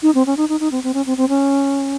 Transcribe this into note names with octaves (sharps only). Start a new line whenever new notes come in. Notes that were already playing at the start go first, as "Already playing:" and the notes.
D#4
C4
C#4
D#4
D#4
D#4
C4
C4
C#4
C4
C4
C#4